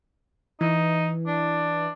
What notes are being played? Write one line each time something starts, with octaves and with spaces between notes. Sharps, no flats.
E3 D#4
D4